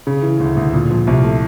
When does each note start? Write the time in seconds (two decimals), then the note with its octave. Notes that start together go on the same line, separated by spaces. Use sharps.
0.07 C#3
0.22 E3
0.40 D2
0.57 D2
0.73 A#2
0.91 F3
1.07 C2
1.24 A3